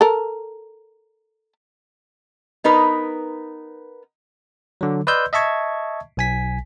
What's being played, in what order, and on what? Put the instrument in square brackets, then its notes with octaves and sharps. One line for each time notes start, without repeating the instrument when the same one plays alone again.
[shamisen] A4 A#4
[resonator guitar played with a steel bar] B3 D#4 A#4 B4
[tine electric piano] D3 F#3
B4 D5 D#5 C6 E6 G6
D#5 E5 A5 C#6 G#6
B1 G#5 B6